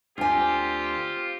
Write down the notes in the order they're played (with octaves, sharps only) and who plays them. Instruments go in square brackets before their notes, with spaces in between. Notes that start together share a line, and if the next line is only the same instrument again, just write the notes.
[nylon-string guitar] D2 G#5 [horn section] C4 F4 G4